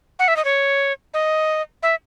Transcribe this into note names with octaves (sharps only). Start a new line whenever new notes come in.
F#5
E5
D#5
C#5
D#5
E5